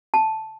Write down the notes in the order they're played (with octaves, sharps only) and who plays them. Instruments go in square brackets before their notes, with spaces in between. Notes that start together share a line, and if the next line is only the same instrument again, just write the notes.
[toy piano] A5